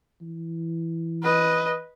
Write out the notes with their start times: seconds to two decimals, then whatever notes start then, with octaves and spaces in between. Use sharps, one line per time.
0.21 E3
1.23 B4 D#5